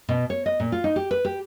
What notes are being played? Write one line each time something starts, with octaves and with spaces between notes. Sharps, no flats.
B2
C#5
D#5
A#2
F4
D#4
G4
B4
G4